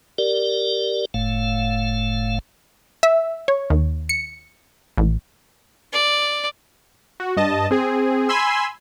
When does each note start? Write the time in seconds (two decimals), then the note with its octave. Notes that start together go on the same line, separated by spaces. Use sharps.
0.18 G4 A#4 D5
1.14 F#1 A2 A3 F5
3.03 E5
3.48 C#5
3.70 D#2
4.09 C#7
4.98 A1
5.93 D5
7.20 F#4
7.37 G2 D#5 A5
7.71 C4 G#4
8.29 G#5 B5 C6 E6